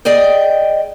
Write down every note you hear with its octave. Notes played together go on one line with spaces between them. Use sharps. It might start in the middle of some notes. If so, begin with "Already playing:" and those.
G#4 D5 D#5 G5